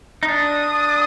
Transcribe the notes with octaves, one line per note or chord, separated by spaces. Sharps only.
D#4
D4 D#6